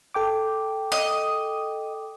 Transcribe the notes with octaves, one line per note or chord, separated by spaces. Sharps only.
A4 G5 D6
D#5